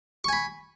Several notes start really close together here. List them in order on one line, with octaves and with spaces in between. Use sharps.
C#6 G#5 B5